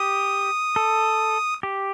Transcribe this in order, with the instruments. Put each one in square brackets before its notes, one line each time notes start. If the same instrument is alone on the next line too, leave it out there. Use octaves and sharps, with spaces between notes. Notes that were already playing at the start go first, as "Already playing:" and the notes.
Already playing: [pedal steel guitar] G4 [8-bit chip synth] D#6
[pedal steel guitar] A4
G4